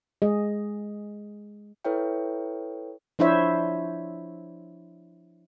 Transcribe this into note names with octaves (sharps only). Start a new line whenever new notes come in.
G#3 G#4 D#5
E4 A4 B4 C#5 E5 G5
F3 D4 E4 C5 C#5 E5